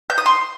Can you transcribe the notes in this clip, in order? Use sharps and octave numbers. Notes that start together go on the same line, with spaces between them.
G6
D#6
C6